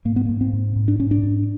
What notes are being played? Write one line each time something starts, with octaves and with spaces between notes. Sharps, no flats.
G#2 A#3
B3
G#2 A#3
C4
G#2
G#2
D4
G#2 C#4
D4
G#2